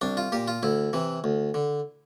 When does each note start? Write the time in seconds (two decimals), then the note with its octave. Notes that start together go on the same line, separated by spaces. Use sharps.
0.01 C2 D4
0.17 F4
0.32 A#2 G4
0.48 F4
0.63 D2 E4
0.93 C3 E3
1.24 D2
1.54 D3